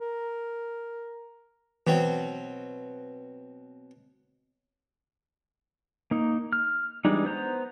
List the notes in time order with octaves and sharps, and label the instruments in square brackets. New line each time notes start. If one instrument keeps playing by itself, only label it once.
[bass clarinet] A#4
[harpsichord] B2 F#3 C4 [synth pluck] E3
[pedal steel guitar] A#3 D#4
F6
E3 G3 G#3 D4 D#4
B3 C5 A#5